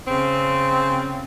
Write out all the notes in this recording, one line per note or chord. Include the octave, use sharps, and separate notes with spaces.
C#3 C4